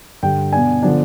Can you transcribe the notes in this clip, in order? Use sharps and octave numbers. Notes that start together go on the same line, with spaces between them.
G2 D3 G3 G5
B2 B3 D4 G#5
D3 F3 B3 D4